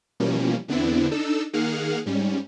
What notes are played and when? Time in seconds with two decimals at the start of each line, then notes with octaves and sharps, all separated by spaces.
0.20 B2 E3 F3 G3 A#3 C#4
0.68 E2 D3 B3 C4 D4 E4
1.11 D4 D#4 A4 E6
1.53 D#3 A#3 G#4 F5 F#5 F6
2.06 G#2 G3 C#4